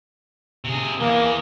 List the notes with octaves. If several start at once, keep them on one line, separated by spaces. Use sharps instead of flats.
C3 G#4
E3 A#3 G#4